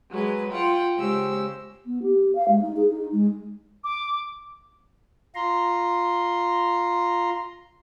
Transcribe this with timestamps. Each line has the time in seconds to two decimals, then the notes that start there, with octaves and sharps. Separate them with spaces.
0.11 F#3 G#3 B4
0.52 F4 F#5 G5
0.97 C#3 G#3 C#4 G4 C5 E6
1.86 B3
2.03 G4
2.35 F5
2.48 G#3
2.62 D#4
2.76 G#4
2.90 D#4
3.12 G#3
3.84 D6
5.35 F4 A#5 C6